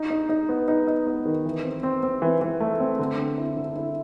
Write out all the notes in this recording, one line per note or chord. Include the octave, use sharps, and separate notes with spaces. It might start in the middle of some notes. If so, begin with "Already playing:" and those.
Already playing: D#4
D#4
D#4
B3
D#4
D#4
B3
D#3
E3
C4
C4
C4
E3
E3
A3
C4
D3
C4
E4
D3
E4